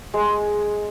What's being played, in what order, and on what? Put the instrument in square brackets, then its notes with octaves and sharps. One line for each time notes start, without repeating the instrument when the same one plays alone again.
[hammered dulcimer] G#3 [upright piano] G#4